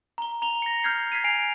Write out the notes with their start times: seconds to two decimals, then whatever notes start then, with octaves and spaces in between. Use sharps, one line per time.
0.18 A#5 G7
0.42 A#5 F7 G7
0.62 A#6 C#7
0.84 F6 G6 G#6 C7
1.12 G#6 B6 C7 D#7
1.24 G#5 C7 D7 F7